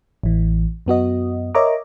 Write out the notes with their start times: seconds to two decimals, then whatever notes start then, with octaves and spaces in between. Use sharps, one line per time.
0.23 A1 E3
0.86 F#2 B3 F#4 D#5
1.55 A#4 C#5 D#5 E5 A#5 D6